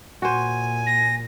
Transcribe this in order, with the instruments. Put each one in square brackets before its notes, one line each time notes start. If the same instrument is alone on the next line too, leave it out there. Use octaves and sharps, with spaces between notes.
[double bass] A#2 [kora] F#4 C5 [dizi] G#5
[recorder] A#6